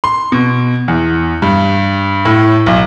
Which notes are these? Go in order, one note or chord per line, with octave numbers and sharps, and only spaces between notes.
C6
B2
E2
G2
A2
B1